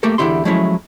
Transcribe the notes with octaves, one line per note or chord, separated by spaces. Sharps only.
A3 A#3 G4 A4 A#4
E2 B2 D3 E4 G4 C6
F3 F#3 G#3 A3 C#4 E4